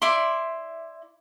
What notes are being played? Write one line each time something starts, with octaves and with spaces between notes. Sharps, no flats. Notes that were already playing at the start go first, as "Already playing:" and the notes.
E4 D5 E5 C6